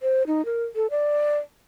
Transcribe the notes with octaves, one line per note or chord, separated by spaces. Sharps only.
C5
D#4
A#4
A4
D5